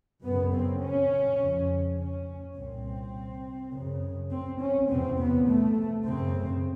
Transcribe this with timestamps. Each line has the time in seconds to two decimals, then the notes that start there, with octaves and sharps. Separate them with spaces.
0.24 F#2 C#3 B3
0.53 C4
0.82 C#4
1.40 F2 C#3
1.98 C#4
2.56 C2 A#2 C4
3.73 F#2 C#3
4.31 C4
4.60 C#4
4.89 E2 C3 C4
5.19 B3
5.48 A3
6.06 F#2 C#3 C4